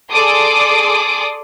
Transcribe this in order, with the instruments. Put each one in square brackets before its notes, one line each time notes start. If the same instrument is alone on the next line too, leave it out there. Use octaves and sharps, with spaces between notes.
[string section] G#4 A4 D5 C6 D6 D#6